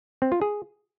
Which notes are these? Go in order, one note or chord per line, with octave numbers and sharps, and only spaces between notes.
C4
F4
G#4